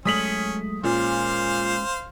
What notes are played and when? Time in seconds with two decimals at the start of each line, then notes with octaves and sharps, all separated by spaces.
0.05 F#3 G#3 A3 C#4 D#6 B6 F#7
0.84 A#2 G#3 C#4 F4 C5 F5